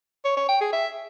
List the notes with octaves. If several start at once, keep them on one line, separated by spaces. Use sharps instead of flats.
C#5
C#5
G5
G#4
E5